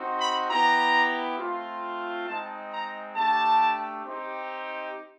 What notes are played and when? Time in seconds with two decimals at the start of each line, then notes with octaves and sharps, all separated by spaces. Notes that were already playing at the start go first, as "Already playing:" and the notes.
Already playing: C4 D#4 F#4
0.20 B5
0.49 B3 E4 G4 A#5
1.38 A3 C4 F4
2.27 G#3 C4 D#4 A5
2.72 A#5
3.16 A3 D4 G4 A5
4.05 C4 D#4 G4